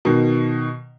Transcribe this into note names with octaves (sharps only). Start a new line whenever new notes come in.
B2 D#3